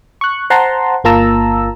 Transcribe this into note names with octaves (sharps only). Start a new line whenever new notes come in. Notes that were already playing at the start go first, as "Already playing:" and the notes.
C#6 F#6
C5 F#5 A5 A#5 C6
G1 A#3 F4 A5 A#5 E6